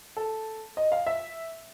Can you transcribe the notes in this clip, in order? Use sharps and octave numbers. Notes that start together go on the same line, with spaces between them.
A4
D#5
F5
E5